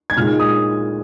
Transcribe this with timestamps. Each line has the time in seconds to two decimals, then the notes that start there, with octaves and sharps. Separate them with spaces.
0.10 G#6
0.17 A#2 G#3 D#4 F6
0.40 D#6